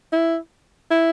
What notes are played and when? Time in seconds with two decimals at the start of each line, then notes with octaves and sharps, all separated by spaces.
0.13 E4
0.90 E4